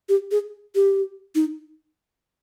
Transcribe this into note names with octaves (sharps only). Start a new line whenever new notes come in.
G4
G#4
G4
D#4